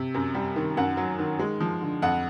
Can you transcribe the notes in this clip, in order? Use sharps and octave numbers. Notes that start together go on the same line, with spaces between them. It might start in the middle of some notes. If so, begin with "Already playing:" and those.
Already playing: C3
F#2
G3
D#3
F#2 F#5
F#3
D#3
G#3
F3
D3
F2 F#5